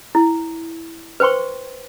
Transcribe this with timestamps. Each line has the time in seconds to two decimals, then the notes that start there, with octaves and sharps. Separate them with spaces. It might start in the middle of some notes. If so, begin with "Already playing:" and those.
0.15 E4
1.20 B4 C5 G5 C6 C#6